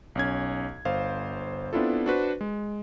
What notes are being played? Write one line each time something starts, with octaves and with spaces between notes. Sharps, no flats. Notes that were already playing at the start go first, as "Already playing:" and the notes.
B1 C#4 G#6
G1 C5 F5
B3 C4 D4 E4 F4 A4
D4 F#4 B4 C5
G#3